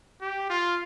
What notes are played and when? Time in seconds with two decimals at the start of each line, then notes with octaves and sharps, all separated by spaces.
0.21 G4
0.50 F4